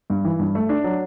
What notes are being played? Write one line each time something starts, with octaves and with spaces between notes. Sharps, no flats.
G2
E3
G2
A3
D4
F#3